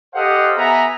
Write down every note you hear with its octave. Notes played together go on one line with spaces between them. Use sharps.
G4 A4 C5 D#5 F5 F#5
B3 E5 G#5 A#5